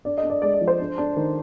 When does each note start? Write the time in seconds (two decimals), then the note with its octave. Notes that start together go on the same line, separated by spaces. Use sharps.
0.05 D4 D5
0.18 D#5
0.23 D4
0.30 D5
0.42 G#3 D5
0.54 D5
0.61 F3
0.68 C5
0.80 D4
0.98 D4
1.17 D#3